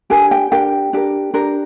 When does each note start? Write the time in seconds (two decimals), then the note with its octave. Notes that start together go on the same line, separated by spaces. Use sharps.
0.10 D4 G4 A#4 G#5
0.31 G5
0.51 D4 G4 A#4 G5
0.93 D4 G4 A#4
1.34 D4 G4 A#4